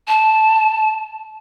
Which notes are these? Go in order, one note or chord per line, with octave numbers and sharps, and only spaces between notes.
A5